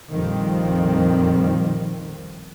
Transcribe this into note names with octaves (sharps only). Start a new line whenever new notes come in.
A#1 F2 D#3 F3 G3 C4